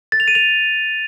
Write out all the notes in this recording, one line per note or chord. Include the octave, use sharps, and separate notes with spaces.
A6
F7
D#7
F7